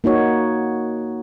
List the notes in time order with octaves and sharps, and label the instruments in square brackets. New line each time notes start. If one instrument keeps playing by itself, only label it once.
[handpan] A#3 D#4 F#4 C#5